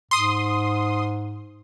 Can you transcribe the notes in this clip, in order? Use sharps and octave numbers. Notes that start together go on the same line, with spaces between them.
G#2 C6 D#6